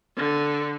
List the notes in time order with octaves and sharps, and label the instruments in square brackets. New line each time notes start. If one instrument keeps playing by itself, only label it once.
[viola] D3